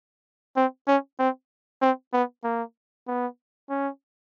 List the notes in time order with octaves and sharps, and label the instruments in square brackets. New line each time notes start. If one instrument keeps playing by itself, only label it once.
[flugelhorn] C4
C#4
C4
C4
B3
A#3
B3
C#4